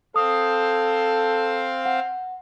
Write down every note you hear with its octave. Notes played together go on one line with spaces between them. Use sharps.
C4 A4 C5 F5 D#6
F#5